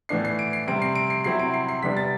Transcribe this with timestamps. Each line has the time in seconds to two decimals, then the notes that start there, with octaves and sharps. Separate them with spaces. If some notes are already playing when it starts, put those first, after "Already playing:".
0.09 A2 E3 B3 D4 C7
0.25 C7
0.39 D7
0.53 C7
0.68 C3 G3 C4 D7
0.82 C7
0.95 D7
1.10 C7
1.24 C3 F#3 C4 E4 C7
1.39 D7
1.54 C7
1.69 C7
1.82 C3 G3 B3 D4 B6
1.97 A6